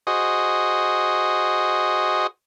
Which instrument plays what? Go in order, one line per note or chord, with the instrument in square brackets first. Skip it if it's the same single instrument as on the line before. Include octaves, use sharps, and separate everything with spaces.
[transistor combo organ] F#4 G#4 C5 D#5